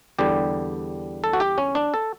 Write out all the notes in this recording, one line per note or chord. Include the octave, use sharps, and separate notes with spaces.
E2 D3 G3 G4
A4
F#4
G4
C#4
D4
A4